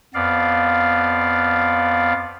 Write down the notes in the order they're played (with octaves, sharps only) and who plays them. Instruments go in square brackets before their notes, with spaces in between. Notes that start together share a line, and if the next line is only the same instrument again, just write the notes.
[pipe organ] F2 B3 D5 F5